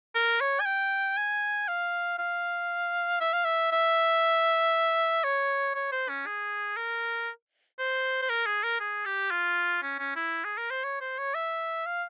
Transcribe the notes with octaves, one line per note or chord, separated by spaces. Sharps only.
A#4
C#5
G#5
G5
G#5
F5
F5
E5
F5
E5
E5
C#5
C#5
C5
C#4
G#4
A#4
C5
C5
A#4
G#4
A#4
G#4
G4
F4
C#4
C#4
E4
G#4
A#4
C5
C#5
C5
C#5
E5
F5